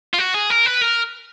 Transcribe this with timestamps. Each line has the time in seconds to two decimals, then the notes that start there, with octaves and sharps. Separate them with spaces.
0.14 F4
0.18 F#4
0.34 G#4
0.50 A#4
0.66 B4
0.81 A#4